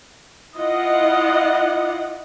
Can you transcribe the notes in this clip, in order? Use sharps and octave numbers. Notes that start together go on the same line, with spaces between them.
E4 F4 D#5 F#5